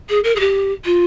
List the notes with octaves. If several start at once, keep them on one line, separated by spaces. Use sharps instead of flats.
G#4
A#4
G#4
G4
F4